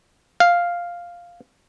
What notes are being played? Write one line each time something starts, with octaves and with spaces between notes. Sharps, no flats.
F5